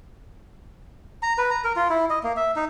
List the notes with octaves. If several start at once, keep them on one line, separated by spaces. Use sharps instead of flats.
A#5
B4
A#5
A#4
F4
E4
D#5
A#3
E5
D#4